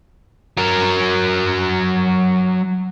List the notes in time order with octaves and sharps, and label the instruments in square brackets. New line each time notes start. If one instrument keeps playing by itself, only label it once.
[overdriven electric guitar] F#3 A#4